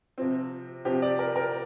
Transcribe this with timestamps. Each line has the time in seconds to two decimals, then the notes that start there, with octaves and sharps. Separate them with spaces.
0.18 C3 F3 C4
0.85 C3 F3 C4 G4
1.02 D5
1.19 A#4
1.36 A#4